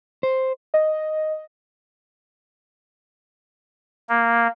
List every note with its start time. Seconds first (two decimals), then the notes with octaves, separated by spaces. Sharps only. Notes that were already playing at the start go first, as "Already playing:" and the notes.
0.23 C5
0.74 D#5
4.09 A#3